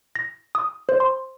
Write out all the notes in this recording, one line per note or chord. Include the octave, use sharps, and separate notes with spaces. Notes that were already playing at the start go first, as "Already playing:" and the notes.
A#6
D#6
C5
C6